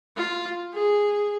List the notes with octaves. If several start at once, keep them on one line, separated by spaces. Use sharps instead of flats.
F4
G#4